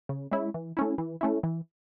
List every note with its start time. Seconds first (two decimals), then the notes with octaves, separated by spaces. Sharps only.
0.09 C#3
0.31 G#3 C#4 E4
0.54 E3
0.77 A3 C#4 E4
0.98 E3
1.21 A3 C#4 E4
1.43 E3